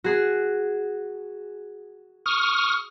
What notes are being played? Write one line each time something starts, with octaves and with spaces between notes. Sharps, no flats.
F#4 G#4
C#6 D#6 F6